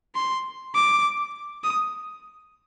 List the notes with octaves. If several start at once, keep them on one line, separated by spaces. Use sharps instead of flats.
C6
D6
D#6